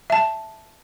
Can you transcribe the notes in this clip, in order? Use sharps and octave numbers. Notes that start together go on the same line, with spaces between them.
E5 A5